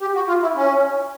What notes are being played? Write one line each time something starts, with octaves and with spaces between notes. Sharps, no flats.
G4
F#4
F4
E4
C#4